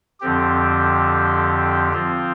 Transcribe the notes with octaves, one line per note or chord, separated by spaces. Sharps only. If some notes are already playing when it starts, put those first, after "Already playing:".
F2 D3 F3 C4 G4
F3 C4 F4